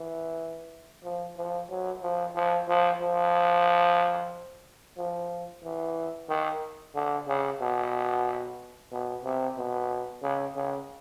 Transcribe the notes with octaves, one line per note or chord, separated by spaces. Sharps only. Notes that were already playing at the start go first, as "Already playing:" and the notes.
Already playing: E3
F3
F3
F#3
F3
F3
F3
F3
F3
E3
D#3
D3
C#3
B2
B2
C3
B2
C#3
C#3